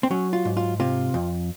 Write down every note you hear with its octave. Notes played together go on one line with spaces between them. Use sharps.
C4
F#3 C#4
F4
G#2
F4
C3 F4
F2